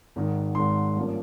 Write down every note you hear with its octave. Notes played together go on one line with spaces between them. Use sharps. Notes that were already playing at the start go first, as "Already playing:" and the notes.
G#1 G#2 D#3
G#1 G#2 D#3 C6
G2 F3 A#3 C#4